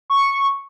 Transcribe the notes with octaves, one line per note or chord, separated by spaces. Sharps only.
C#6